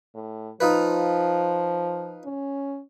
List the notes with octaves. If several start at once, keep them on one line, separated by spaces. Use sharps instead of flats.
A2
F3 D#4 F4 B4
C#4